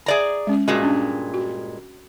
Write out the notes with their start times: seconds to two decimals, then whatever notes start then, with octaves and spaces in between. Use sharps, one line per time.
0.06 G#4 D5 A#5
0.47 G#3 C#4
0.68 G2 A#2 G#3 F#4
0.83 C#4 D4
1.34 F#4